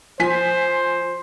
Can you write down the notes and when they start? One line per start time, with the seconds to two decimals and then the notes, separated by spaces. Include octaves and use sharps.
0.20 F3 C5 G#5 B6